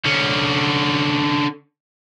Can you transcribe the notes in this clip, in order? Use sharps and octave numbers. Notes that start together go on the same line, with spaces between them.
D3 C#4